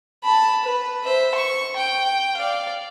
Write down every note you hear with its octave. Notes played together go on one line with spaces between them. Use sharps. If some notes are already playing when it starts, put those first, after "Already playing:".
A5 B5
B4
C5 E5
C#6
G5
D5 F5